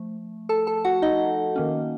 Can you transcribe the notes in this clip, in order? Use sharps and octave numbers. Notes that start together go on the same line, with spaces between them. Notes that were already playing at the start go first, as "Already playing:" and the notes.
Already playing: F3 A3
A4 A5
A4 A5
F#4 F#5
D#4 D#5
D#3 A#3 C#4